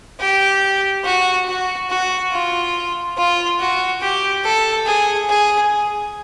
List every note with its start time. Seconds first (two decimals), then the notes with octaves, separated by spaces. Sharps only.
0.20 G4
1.05 F#4
1.47 F#4
1.90 F#4
2.32 F4
3.18 F4
3.60 F#4
4.02 G4
4.44 A4
4.86 G#4
5.29 G#4